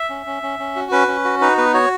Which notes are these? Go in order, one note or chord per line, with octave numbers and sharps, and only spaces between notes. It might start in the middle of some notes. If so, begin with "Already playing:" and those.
Already playing: E5
C#4
C#4
C#4
C#4
F#4
C#4 B4
C#4
F#4
D#4 B4
B3 B4
F#4 C#5